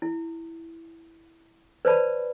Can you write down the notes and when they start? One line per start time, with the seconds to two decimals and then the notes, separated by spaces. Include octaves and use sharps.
0.02 E4
1.85 B4 C5 D5 A5 B5